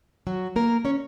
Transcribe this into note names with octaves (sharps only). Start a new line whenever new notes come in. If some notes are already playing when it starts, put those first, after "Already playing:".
F#3 F#4
A#3 A#4
C#4 C#5